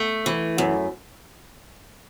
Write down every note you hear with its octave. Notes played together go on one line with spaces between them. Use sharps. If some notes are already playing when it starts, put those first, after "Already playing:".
Already playing: A3
E3
F#2